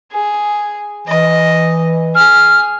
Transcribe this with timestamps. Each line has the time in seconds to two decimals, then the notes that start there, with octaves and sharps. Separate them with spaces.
0.12 G#4
1.07 E3 D#5
2.15 G#4 F6